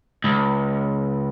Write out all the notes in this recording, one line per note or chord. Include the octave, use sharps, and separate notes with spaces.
C#2